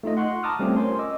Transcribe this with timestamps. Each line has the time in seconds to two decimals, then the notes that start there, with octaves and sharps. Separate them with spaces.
0.03 A3 D#4 F4 D#5
0.17 F#5 C6 C#6 F#6
0.43 A5 A#5 D6 D#6 F6
0.59 G3 A3 C4 C#4 F4
0.77 A#4 C5 C#5 G#5 C6
0.99 D#5 D6 E6